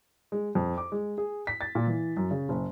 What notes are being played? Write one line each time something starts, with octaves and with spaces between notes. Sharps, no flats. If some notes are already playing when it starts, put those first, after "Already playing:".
G#3
F2
D6
G#3
G#4
B6
A6
A#2
E3
F#2
C#3
F#1